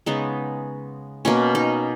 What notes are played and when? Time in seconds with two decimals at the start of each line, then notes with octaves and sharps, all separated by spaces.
0.06 C#3 G#3 B3 D#4
1.25 B2 A#3 C#4
1.55 D#4